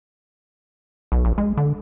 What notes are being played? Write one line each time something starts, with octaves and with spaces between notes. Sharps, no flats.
B1
A#1
G#3
D3